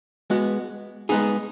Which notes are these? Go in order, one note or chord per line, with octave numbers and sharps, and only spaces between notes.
G#3 B3 F#4
G#3 B3 D#4 G#4